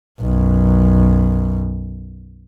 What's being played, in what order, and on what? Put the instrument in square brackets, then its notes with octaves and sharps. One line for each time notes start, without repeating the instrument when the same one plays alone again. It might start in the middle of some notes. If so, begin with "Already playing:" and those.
[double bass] B1 F#2